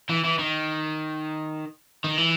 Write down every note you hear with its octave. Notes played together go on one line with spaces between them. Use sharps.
E3
E3
D#3
D#3
E3